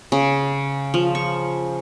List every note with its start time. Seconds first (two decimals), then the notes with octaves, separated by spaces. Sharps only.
0.12 C#3
0.94 F3
1.15 C#6